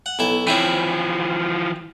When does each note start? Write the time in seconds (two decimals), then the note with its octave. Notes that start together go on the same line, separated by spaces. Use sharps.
0.06 F#5
0.19 B1 E4 A4
0.47 E3 F3 C4 E4 C#5